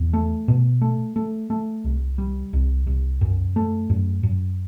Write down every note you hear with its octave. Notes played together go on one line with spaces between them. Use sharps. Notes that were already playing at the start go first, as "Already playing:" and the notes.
Already playing: E2
A3
B2
A3
A3
A3
C2
G3
C2
C2
F#2
A3
F#2
F#2